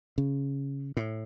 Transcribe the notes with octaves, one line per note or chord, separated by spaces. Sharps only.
C#3
A2